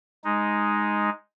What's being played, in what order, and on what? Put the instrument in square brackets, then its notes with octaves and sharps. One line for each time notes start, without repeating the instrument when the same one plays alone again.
[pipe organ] G#3 D#4